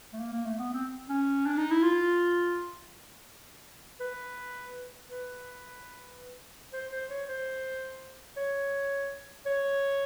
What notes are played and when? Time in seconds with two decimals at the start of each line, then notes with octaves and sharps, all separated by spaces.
0.13 A3
0.19 A#3
0.33 A#3
0.46 A3
0.59 B3
0.74 C4
1.09 C#4
1.46 D4
1.58 D#4
1.71 E4
1.83 F4
4.00 B4
5.11 B4
6.73 C5
6.92 C5
7.10 C#5
7.28 C5
8.37 C#5
9.46 C#5